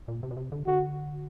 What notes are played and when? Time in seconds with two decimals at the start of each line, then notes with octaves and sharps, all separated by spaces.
0.08 A#2
0.23 C3
0.31 B2
0.37 C3
0.52 D3
0.67 D3 F#4